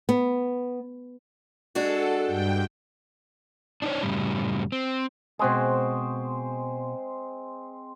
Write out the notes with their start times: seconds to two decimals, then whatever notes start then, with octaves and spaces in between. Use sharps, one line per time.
0.09 B3
1.75 G#3 D4 F#4 A4
2.25 G2 G5
3.82 D4 D#4 C5 C#5
4.03 F#2 A2 C#3 F#3 G3
4.72 C4
5.39 B2 G#3 C4 F#4 G#4 C5